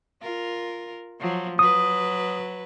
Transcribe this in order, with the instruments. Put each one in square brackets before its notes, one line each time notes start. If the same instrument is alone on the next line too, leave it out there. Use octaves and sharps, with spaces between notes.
[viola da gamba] F4 A#4
F3 F#3
[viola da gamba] F#3 B4 [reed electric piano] D#6